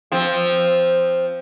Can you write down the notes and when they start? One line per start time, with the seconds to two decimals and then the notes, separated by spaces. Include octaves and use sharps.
0.12 F3 C4